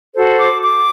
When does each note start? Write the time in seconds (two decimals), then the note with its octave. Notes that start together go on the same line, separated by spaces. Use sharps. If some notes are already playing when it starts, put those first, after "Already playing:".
0.14 F#4 A4 C5
0.38 D6
0.62 D6